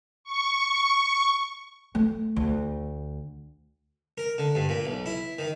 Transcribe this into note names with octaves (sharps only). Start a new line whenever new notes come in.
C#6
A3
D2
A#4
D3
G2
A#2
B1
E4
D#3